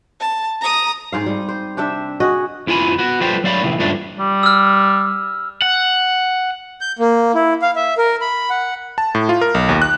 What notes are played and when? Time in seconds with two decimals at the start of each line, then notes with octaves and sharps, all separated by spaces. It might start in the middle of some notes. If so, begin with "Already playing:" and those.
0.20 A5
0.61 A#5 D#6
1.12 G#2 C4 F5
1.26 G3
1.48 C5
1.77 C3 D4 G4 E5
2.20 F#4 G#4 D#5
2.67 F2 E4 F4 G#5 B5
2.99 B3 F#4
3.21 F3 G3 G4 A4 B4 C5
3.44 F#3 D5 F5 B5
3.63 A2 C3 E3 F3
3.79 C#2 G2 F3 D4 A4 E5
4.19 G3
4.43 E6 F6
5.62 F#5
6.81 G6
6.99 A#3
7.35 E4
7.62 F5
7.76 E5
7.98 A#4
8.21 B5
8.50 F#5
8.98 A5
9.15 A2
9.29 F4
9.41 A#4
9.54 B1
9.69 D#2
9.82 F#6